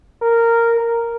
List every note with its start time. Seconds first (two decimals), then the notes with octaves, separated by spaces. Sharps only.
0.22 A#4
0.80 A#4